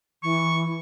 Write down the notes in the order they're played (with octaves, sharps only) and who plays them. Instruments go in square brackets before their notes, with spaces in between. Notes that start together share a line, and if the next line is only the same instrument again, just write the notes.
[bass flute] E3 [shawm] C#6